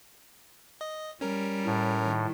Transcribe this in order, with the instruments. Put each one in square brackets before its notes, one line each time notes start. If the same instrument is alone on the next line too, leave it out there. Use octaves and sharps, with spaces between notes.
[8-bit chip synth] D#5
[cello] G3 [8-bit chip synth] C#4 A#4
[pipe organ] A2
[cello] D#3 G3